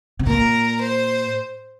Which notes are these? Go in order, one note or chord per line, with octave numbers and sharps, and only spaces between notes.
C3
A#2 A#4
C5